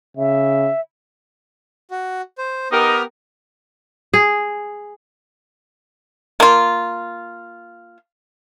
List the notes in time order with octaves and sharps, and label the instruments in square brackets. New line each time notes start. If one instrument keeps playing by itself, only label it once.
[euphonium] C#3 [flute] E5
[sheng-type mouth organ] F#4
C5
[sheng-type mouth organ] B3 [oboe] D#4 [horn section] G4 A#4
[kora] G#4
[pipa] A#3 F4